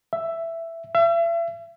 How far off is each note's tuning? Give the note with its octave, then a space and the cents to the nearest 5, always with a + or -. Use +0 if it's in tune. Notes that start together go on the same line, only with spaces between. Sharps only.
E5 +10
E5 +40